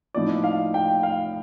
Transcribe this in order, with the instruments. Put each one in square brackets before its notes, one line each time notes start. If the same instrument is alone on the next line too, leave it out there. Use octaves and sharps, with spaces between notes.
[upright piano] A2 F3 A#3 D#4 [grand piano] D5
[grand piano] F5
G5
F5